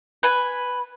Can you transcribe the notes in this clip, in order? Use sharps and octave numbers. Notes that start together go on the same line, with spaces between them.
B4 G#5